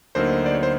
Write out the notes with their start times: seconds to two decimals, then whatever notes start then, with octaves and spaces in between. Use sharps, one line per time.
0.15 D2 D3 F#3 A#3 D#4 A#4 C5
0.46 D5
0.54 C#5
0.63 C5